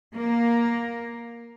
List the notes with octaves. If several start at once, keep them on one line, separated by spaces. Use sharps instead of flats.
A#3